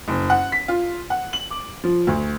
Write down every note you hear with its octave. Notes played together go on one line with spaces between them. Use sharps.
F#1
F#5
B6
F4
F#5
F#7
D6
F3
D2